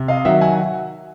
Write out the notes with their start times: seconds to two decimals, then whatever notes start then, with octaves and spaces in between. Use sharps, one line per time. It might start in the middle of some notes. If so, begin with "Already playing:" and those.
Already playing: C3
0.08 D#5 F5
0.25 D#3 F#3 E5 F#5
0.41 F#5 G#5